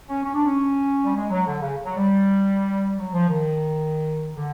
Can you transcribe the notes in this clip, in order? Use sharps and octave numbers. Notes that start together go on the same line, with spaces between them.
C#4
C#4
D4
C#4
G3
G#3
F#3
D3
C#3
F#3
G3
F#3
F3
D#3
D3